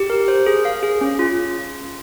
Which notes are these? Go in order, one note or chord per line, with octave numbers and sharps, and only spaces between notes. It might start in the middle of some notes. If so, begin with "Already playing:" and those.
Already playing: G4
A#4
C5
G#4
F5
G#4
C#4
F4